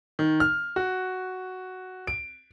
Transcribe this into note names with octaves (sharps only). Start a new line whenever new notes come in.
D#3
F6
F#4
D7